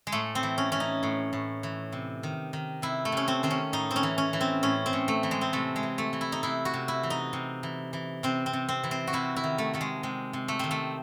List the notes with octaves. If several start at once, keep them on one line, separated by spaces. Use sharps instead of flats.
G#3
A2 A3
C4
E3
C#4
E3 C#4
D#4
A2
A2
E3
C3
D#3
D#3
C3 E4
A3
C3 C#4
C4
D#3 C4
C#4
A2 D#4
C4
C#4
E3
C#4
E3
C4
A2 C#4
C4
A2
A3
E3
G#3
C4
C3 A3
G#3
E3
A3
E3
E4
D#4
C3 E4
F#4
C3
E4
E3
D#4
C3
E3
E3
C3 C4
C4
C3
C4
E3
C4
F#4
C3 E4
E4
D#3
A3
D#3 A3
G#3
C3 G#3
C3
A3
D#3 C4
A3